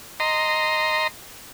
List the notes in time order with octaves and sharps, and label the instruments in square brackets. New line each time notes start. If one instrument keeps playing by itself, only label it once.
[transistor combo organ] D#5 A#5 C6